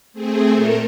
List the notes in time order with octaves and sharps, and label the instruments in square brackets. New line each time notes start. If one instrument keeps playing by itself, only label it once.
[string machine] A3 C4 G#4
A#2 A3 A4 A#4